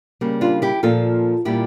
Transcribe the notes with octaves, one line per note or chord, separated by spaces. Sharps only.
C#3 G3 A#3
D4 F4
E4 G4
A#2 F3 A#3 F4 A4
A#2 G3 A#3 E4 G4